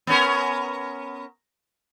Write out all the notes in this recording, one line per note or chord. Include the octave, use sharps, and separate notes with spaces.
B3 C#4 A#4